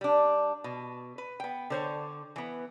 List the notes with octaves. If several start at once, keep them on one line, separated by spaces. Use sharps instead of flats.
G3 D4
B2
B4
B3 G5
D3 C5 C#5
E3 B3